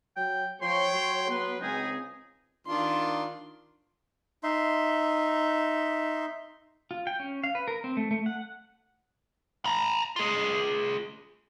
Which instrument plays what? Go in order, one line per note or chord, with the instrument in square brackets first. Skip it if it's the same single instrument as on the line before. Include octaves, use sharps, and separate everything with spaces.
[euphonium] F#3 [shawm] G5
[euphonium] F3 [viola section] C#5 [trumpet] G5 [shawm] C6
[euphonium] F#3 [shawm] C6
[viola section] B3 [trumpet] B4
[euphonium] C#2 [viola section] C4 G#5 [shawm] D#4 [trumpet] G#4
[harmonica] D#3 D4 F4 [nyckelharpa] C6
[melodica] D#4 E5 C6
[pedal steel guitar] F4
G5
C#4
F5
B4
A#4
C4
A3
A3
F#5
[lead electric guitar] A#5 B5
F4 G#4